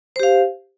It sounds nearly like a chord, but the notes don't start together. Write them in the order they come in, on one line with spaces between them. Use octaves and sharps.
C5 G4 F5